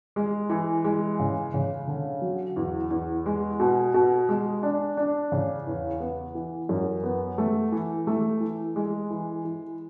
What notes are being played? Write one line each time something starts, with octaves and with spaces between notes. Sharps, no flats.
G#3
E3
G#3
C#3
C#3
D3
F#3
E2
E2
G#3
B2
B2
G#3
D4
D4
C#3
E2
B3
E3
F#2
B3
A3
E3
A3
E3
G#3
E3
E3